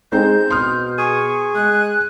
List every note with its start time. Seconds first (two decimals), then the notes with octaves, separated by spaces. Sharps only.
0.12 G#3 C4 D#4 C5 G6
0.50 B2 C6 D#6 F6
0.98 G#4 C#6
1.55 G#3 F#6